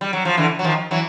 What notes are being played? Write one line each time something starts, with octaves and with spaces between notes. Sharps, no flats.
G3
F#3
F3
D3 E3
F#3
D#3 F3
E3 F#3